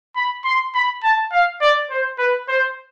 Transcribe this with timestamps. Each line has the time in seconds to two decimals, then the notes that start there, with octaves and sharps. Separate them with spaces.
0.16 B5
0.44 C6
0.74 B5
1.03 A5
1.32 F5
1.61 D5
1.90 C5
2.18 B4
2.48 C5